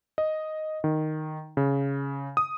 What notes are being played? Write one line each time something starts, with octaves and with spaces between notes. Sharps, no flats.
D#5
D#3
C#3
D#6